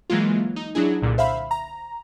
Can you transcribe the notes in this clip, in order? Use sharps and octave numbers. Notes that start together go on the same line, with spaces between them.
E3 F#3 G#3 A#3 F4
D#4
F#3 D4 E4 G#4
C2 A#2 D3
C5 E5 F5 B5
A#5